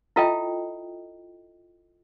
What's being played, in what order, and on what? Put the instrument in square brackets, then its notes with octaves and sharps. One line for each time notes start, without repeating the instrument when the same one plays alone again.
[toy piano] E4 F4 A4 D#5 E5 G5